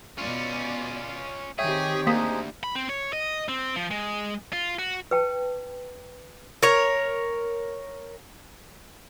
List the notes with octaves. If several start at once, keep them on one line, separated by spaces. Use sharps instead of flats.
B2 C#4 F4 D5
D#3 C4 G4 G#4 C#5 E5 G5
D2 A#3 D#4 G#4 C5 D#6 B6
B5
C4
C#5
D#5
C4
F3
G#3
F4
F#4
B4 G5 A5
A#4 C#5